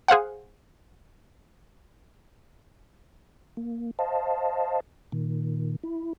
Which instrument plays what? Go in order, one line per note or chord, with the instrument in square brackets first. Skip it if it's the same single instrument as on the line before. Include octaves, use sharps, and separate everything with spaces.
[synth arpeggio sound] G#4 C5 F5 F#5
[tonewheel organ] A#3
C5 D#5 F5 A5
A#2 D#3
E4